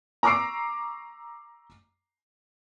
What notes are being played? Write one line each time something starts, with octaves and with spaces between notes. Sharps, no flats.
A#5 C#6 D6 E6 C7 D7